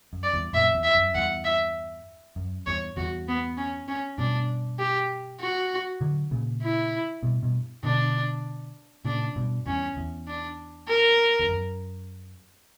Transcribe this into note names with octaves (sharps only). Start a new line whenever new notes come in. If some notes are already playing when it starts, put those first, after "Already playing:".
F#2
D5
E2 G2
F#2 A#2 E5
E2
E5
F#2
E2 G2 F#5
E5
F#2
E2 G2 C#5
E2 G2 F#4
B3
C#4
C#4
G2 B2 D4
G4
F#4
D3 F#3
A#2 C#3
E4
G2 B2
G2 B2
B2 D3 D4
A#2 C#3 D4
G2 B2
E2 G2 C#4
E2
D4
A#4
E2
F#2